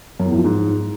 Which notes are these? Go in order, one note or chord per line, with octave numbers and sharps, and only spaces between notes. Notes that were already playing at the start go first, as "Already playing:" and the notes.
F#2
E2
A2
F3
G#2